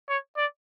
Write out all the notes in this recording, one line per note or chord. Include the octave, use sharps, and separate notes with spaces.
C#5
D5